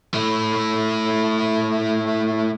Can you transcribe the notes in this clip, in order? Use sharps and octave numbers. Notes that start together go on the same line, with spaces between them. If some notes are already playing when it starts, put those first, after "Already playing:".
A3 E4